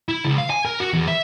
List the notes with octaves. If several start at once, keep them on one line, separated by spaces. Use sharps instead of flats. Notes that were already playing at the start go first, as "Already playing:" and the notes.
E4
C#2
F5
G#5
A#4
F#4
E2
E5